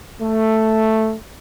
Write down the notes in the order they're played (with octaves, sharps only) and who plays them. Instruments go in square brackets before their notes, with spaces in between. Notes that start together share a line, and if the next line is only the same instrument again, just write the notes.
[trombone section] A3